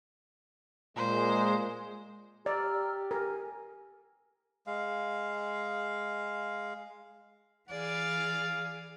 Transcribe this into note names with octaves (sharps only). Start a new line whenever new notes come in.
A#2 G#3 C5
G4 D5 A#5 E6 F6
A#4 G#5
G#3 F5
E3 G#4 D5 F5